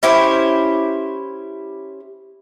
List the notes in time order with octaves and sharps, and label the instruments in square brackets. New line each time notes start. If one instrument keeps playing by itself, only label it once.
[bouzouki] C#4 E4 G4 C5